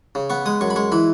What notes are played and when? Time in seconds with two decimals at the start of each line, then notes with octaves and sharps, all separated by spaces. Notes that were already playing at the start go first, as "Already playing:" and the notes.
0.15 C#3
0.30 B3 C#6
0.46 G#3 D#6
0.61 F#2 C#6
0.70 B5
0.76 G#3 C#6
0.92 E3 B5